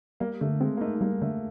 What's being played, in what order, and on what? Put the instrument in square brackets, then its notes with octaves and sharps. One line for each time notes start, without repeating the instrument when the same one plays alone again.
[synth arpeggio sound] G3 [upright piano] A#3
[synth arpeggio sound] D3 [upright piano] A3
[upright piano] G#3 [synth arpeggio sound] C4
[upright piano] A#3
[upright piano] A3 [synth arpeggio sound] D#4
[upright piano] A3
[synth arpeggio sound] G3 [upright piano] A#3
[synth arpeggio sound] D3 [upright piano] A3